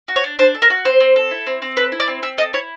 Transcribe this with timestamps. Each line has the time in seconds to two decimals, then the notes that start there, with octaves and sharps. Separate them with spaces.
0.08 F#4
0.16 C#5
0.24 D4
0.39 D4 C5
0.55 A4
0.62 A#4
0.70 F#4
0.85 C4 C5
1.00 C4
1.16 A4
1.31 E4
1.47 C4
1.62 C4
1.77 A4 B4
1.92 E4
2.00 D5
2.08 C4
2.22 C4 E5
2.38 A4 D#5
2.53 E4 C#5